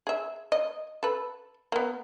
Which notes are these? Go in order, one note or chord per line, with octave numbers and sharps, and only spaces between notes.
G#4 E5
D#5
A4 B4
A#3 B3